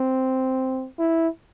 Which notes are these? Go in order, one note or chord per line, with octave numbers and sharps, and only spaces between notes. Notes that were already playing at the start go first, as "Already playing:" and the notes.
Already playing: C4
E4